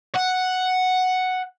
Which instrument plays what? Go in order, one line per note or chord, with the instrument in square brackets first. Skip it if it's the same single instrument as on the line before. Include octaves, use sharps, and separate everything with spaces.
[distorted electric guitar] F#5